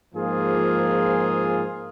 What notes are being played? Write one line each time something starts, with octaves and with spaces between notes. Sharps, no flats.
G#2 F3 A#3 F4 G#4